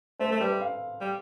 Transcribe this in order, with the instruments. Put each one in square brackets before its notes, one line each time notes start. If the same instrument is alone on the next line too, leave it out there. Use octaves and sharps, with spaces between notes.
[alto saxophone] A3 [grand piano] C5
[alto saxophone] A3 [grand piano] A4
[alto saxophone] G3 [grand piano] B4
[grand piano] E5
F5
[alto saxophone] G3